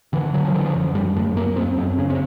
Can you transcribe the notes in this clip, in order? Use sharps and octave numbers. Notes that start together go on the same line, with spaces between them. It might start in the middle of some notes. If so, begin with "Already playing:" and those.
D3 E3
D3 F#3
F3
D3 E3
F3
F#2
F#2 G3
F#2 A3
F#2 A#3
F#2 C4
F#2 C4
C#3 C#4
C4